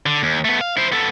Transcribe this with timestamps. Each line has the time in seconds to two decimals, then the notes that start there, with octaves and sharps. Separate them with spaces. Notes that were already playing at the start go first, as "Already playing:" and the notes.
0.06 D3
0.23 D#2
0.45 A3 B3
0.61 F5
0.77 E4 C5
0.92 B3 A4